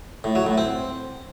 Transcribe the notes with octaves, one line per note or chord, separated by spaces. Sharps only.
A2
F#3
A2
C4